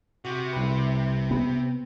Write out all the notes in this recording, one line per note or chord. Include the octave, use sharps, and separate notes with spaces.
C3 F#4
C2 B4
B3